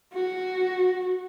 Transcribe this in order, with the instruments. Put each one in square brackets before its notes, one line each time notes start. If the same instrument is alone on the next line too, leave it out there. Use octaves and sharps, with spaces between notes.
[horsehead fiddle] F#4